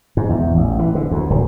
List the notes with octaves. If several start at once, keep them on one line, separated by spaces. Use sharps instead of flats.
G#2
E2
A1
E3
D3
D2
D1